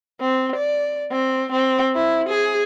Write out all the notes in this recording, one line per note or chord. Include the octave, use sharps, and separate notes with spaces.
C4
D5
C4
C4
E4
G#4